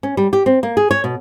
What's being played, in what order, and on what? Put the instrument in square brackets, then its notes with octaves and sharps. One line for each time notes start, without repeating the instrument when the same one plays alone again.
[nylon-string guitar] C#4
G3
G4
C4
A#3
G#4
C#5
B2